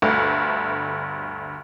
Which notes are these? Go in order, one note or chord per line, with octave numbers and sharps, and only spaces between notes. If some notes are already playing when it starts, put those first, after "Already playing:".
G1 D2 G2 A3